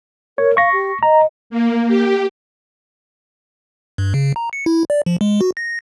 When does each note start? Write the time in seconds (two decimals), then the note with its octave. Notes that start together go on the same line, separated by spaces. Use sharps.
0.38 A#4 C#5
0.57 F5 C#6 A#6
0.72 G4
1.03 D#5 A#5
1.50 A#3
1.87 G4
3.98 G2
4.14 C#3
4.36 A#5
4.53 C#7
4.66 E4
4.90 D5
5.06 F3
5.21 G#3
5.41 F#4
5.57 A#6